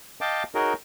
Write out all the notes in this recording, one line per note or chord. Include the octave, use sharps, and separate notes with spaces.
D#5 F5 G5 A5 D6
D#4 F#4 G#4 A#4 C#5 D#5